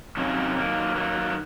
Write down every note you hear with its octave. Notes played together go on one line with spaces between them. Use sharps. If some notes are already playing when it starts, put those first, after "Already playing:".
C3 D#3 F#3 A#3 C#4
D#3 F#3 A#3
D#3 F#3 A#3